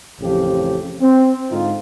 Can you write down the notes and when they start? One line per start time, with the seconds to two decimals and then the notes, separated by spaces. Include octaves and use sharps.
0.20 A1 F2 C#3 F3 G4
1.00 C4
1.50 G#2 D3 D#4 F4